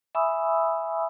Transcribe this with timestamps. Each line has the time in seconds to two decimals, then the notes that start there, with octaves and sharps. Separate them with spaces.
0.15 E5 G#5 B5 C#6 D#6 E6